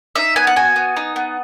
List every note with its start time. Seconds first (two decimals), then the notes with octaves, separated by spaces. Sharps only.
0.15 D#4 E5
0.36 B3 G#5
0.47 F#5
0.56 F#4 G#5
0.76 B3
0.96 D#4
1.16 B3